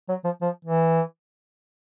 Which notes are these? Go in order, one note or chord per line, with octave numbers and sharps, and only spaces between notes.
F#3
F3
F3
E3